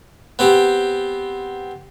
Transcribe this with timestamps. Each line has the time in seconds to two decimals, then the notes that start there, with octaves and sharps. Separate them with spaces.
0.39 B3 C4 G4